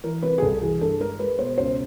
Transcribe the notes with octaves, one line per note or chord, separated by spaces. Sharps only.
E3 A#4
C3 B4
G#4
C2 A4
E3 G#4
G2 A4
G#3 A#4
G#3 B4
B2 C5
C#2 C5